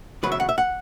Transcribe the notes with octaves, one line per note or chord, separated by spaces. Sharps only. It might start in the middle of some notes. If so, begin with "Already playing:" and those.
E2 C#3 F#3 B4
E5
F#5
E5
F#5